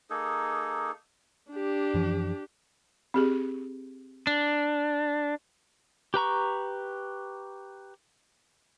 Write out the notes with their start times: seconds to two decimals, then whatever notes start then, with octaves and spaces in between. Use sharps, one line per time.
0.10 A#3 D#4 G#4 A4
1.52 D4 G4
1.94 F#2 E3 F3
3.14 C4 G4 G#4
4.27 D4
6.14 G4 B4 A#5 C#6